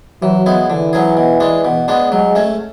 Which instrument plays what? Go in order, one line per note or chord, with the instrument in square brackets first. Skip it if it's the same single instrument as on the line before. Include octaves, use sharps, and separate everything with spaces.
[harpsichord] E3 [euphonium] F#3
[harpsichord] G#3 B3 E4
[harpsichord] D3 [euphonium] E3
[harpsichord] F#3 C#4 G#4
B2
G#3 D4
B2
G#3 B3 D4
[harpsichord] F#3 [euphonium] G#3
[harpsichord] A3 C#4